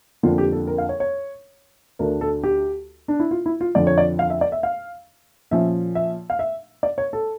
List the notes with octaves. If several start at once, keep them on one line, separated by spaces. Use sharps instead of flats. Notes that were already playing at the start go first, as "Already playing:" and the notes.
F2 D3 F3 A#3 D4 F4
G4
A4
A#4
F5
C#5
C#5
D2 D3 A3 D4 A#4
A4
G4
D4
E4
F4
E4
F4
F2 D3 F3 D5
C#5
D5
F5
E5
D5
E5
F5
A#2 F3 C#4 E5
E5
F5
E5
D5
C#5
A4